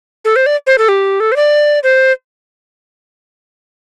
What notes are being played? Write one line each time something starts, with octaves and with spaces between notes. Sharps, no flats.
A4
C5
D5
C5
A4
G4
A4
C5
D5
C5